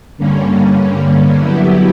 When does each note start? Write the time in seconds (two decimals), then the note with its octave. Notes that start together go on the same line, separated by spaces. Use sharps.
0.18 G2 D3 G3 A#3 C#4
1.37 F#3 B3 E4 G4